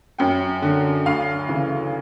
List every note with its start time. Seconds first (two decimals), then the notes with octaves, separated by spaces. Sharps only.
0.18 F#2 G5
0.62 D3
1.06 D2 F5
1.48 C#3 E3